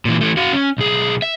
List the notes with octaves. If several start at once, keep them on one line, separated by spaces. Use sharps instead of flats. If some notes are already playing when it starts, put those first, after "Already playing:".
A#2 E3
E3 A3
F#4 F5
C#4
B1 G#4
E5